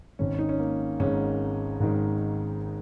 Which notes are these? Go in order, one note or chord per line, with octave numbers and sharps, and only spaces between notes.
G#1 G#2 D#3 C#4
D#4
C#4
A#3
G#1 G#2 D#3 C#4
G#1 G#2 D#3